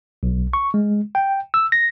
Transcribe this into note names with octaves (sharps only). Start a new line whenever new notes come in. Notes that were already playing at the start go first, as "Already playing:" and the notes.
B1
C#6
G#3
G5
E6
A#6